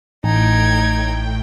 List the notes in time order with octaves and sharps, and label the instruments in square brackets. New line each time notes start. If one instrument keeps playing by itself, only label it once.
[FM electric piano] A1 [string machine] A2 G5 [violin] D#4 G#6